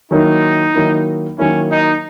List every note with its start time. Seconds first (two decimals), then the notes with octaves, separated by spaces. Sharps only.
0.11 D#3 F#3 A#3 D#4 E4
0.74 D#3 F#3 A#3 E4
1.38 D#3 F#3 A#3 C#4 E4
1.70 D#4